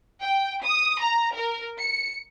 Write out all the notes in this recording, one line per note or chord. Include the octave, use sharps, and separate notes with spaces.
G5
D#6
A#5
A#4
C#7